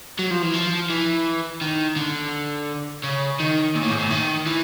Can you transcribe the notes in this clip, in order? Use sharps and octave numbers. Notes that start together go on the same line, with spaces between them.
F#3
F3
E3
F3
E3
D#3
D3
C#3
D#3
A#2
A2
G#2
A2
D#3
E3